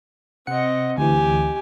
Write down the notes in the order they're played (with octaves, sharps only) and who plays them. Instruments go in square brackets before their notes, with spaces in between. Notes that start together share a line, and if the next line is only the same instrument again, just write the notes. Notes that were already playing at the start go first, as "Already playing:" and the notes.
[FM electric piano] C3 F#5 C#7 [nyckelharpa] C4 D#5
[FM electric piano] D2 E3 [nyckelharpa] G4 G#5